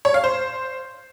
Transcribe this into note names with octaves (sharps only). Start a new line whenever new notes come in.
C#5
F5
C5